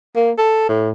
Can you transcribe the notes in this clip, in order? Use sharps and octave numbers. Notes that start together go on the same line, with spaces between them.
A#3
A4
A2